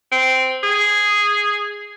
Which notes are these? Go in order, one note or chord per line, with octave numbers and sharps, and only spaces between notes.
C4
G#4